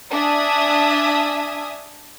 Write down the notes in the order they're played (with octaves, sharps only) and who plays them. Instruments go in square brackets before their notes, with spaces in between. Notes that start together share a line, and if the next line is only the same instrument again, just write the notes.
[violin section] D4 E5 G#5 D#6